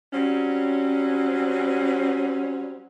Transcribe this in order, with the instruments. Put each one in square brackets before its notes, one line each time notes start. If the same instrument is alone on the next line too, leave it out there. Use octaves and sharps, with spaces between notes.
[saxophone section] F#3 G3 C4 C#4